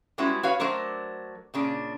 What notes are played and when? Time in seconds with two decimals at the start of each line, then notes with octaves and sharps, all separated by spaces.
0.18 G3 G#3 B3 C#4 E4 F#4
0.43 F#4 B4 C#5 F5
0.60 F#3 A3 D4 A#4 C5
1.54 A#2 C#3 D4